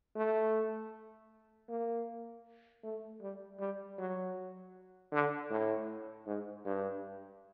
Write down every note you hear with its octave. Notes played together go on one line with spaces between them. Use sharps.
A3
A#3
A3
G3
G3
F#3
D3
A2
G#2
G2